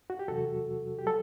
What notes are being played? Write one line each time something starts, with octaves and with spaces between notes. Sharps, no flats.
F#4
G4
E2 C3 F#3 F#4 A4
G4
F#3 A4